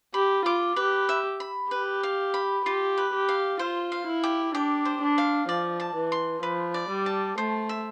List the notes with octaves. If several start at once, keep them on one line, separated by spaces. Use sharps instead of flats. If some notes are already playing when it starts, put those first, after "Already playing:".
G4 B5
F4 D6
G4 B4
E5
B5
G4 B4
F5
B5
F4 G4
B4
G4
F5
F4 C5
F5
E4
G4
D4 G4
C5
D4
F5
F3 D5
A5
E3
C6
F3 B4
D5
G3
A5
A3 C5
E5